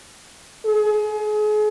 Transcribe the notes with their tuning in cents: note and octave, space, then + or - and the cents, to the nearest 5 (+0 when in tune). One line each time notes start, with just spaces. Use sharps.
G#4 +35